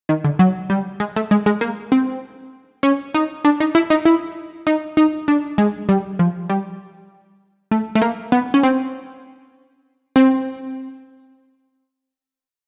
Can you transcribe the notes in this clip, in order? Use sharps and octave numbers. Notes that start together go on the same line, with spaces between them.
D#3
D3
F#3
G3
G#3
A3
G#3
G#3
A#3
C4
C#4
D#4
D4
D#4
E4
D#4
E4
D#4
D#4
D4
G#3
G3
F3
G3
A3
A3
A#3
B3
C#4
C4
C4